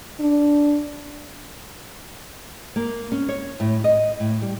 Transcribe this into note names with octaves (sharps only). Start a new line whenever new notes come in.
D4
A#3
C#4
C#5
A2
D#5
A2
G3